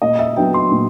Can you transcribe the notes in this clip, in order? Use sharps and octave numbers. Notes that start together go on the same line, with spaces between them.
A#2 D#5
E5
F#3 B3 D4 G5
C6
A#2